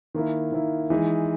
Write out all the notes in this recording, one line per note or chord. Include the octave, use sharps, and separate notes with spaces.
D#3 A#3 E4
D#3 A#3 E4
E3 G#3 D#4